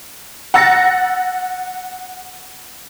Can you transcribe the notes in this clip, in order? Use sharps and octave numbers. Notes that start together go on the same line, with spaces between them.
F#5 E6 A6 A#6 C#7